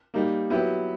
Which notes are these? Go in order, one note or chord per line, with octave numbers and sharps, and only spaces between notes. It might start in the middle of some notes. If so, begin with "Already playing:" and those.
G3 A#3 D#4
F#3 B3 E4 G4